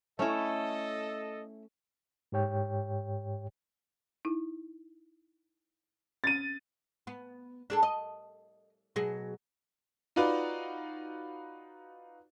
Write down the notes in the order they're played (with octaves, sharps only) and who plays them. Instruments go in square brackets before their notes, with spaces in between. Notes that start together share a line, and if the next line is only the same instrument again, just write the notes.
[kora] A3 C#4 [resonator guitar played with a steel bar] E4 C#5 [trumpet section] A4 D#5
[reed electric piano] G#2 G4 C#5 G5
[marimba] D#4 E4
[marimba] C#4 [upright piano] A6 D#7
[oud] B3
D4 G#4 A4
D#5
B2 F#3 G#4
[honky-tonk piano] D#4 F4 F#4 B4 D5